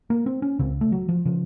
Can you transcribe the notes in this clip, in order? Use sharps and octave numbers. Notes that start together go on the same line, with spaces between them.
A#3
C4
C#4
C#2 C#3 C4
A3
F#3
F3
C#3 F3